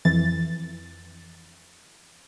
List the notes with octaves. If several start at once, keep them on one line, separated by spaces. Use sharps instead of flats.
F2 E3 A6